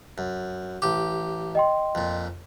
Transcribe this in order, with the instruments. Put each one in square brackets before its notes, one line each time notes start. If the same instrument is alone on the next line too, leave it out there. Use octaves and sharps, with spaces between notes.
[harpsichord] F#2
[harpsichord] A1 G4 [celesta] D6
[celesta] D#5 G5 C6
[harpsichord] F2 A#2